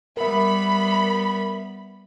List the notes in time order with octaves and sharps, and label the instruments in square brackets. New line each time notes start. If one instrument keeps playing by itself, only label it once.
[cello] G3 B3 [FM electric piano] A#4 E5 [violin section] B5